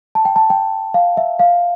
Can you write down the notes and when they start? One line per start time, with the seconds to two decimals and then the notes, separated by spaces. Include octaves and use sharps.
0.15 A5
0.25 G5
0.36 A5
0.50 G5
0.94 F5
1.17 E5
1.39 F5